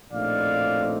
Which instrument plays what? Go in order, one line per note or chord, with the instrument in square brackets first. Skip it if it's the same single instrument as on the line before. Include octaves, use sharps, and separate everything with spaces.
[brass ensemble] A#1 A2 A3 C4 D#4 D5 F5